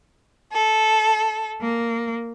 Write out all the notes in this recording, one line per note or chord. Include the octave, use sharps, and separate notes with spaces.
A4
A#3